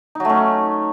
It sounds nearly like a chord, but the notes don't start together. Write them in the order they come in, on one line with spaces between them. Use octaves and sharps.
D#4 F#3 A3 C#4